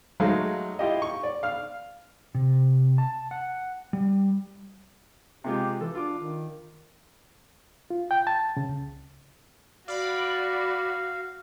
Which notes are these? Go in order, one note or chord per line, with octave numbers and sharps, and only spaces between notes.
F#3 G#3 A3 D#4 F5
E4 F4 G4 D#5
C#6
D5
F5 F6
C3
A5
F#5
G3
C3 G#3 F4 G4
E3 A4
D4 F4 D6
D#3
F4
G5
A5
C#3
C#2
F#4 D5 F5 B5